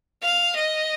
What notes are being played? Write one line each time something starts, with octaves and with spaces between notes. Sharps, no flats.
F5
D#5